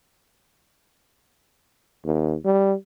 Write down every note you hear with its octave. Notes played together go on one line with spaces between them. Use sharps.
D#2
G3